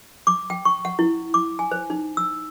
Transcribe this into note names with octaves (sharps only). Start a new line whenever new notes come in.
D6
G5
C#6
F#5
E4
D6
G#5
C5
D#4
E6